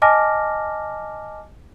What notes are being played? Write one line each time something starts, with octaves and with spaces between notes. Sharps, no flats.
D#5 G#5 A5 D6 F6 A#6